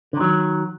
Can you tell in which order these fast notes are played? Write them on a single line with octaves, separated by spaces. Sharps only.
D3 D#3 F#3